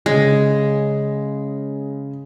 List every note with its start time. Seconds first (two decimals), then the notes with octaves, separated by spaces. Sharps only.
0.06 C#3 G#3